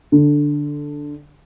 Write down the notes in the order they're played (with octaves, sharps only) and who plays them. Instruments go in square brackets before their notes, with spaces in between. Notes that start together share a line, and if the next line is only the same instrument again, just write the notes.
[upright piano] D3